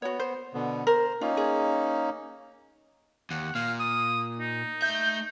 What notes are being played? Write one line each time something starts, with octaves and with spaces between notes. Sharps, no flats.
B3 F#4 C#5
C5
B2 D3 B3
A#4 C5
A#3 C#4 D#4 F4
G#4
D#2 F#5
A#2 F5
D#6
D#4
A3 E5 G6